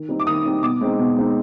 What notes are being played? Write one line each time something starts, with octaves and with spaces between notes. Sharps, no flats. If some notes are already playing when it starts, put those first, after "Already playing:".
Already playing: D#3
G3 C4 D#4
D6
D#3 D#6
G3 C4 D#4
B2 D6
G#3 C4 D#4
B2
G#3 C4 D#4